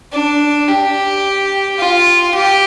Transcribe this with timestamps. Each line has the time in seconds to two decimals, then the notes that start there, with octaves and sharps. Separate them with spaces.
0.13 D4
0.68 G4
1.79 F4
2.34 G4